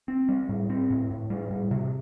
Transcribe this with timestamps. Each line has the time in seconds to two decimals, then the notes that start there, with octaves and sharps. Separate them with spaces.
0.08 C4
0.29 G3
0.49 A2
0.69 C4
0.90 A2
1.11 A2
1.30 G3
1.51 A2
1.71 C3